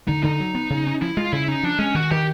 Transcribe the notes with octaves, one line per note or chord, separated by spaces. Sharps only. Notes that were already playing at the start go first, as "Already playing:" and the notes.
D3 D#4
D3 D#4
F#3
B3
C#3
C#4
F3 E4
G#3 F4
C#3 E4
C#4 D#4
F3 D4
G#3 C#4
D#3 F#4
D#3 G4